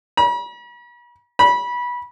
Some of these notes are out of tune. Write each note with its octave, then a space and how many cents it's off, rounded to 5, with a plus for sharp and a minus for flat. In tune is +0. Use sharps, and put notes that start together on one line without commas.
B5 -45
B5 -20